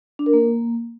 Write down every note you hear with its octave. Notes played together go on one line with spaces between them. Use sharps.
D4
A#4
A#3